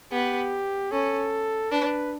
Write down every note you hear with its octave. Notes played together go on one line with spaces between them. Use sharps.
B3 G4
C#4 A4
D4 B4